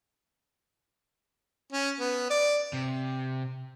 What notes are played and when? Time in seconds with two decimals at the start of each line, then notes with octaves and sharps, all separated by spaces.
1.72 C#4
2.00 B3
2.30 D5
2.73 C3